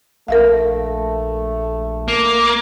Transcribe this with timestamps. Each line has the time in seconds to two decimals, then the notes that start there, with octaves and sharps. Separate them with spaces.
0.28 A#1 A3 A#4 E5 F5
2.08 A#3